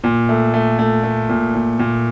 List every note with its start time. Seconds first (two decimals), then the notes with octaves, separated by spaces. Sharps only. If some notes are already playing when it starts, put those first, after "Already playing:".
0.04 A#2
0.29 A3
0.54 A3
0.79 A3
1.03 A3
1.29 A#2
1.55 A#2
1.79 A#2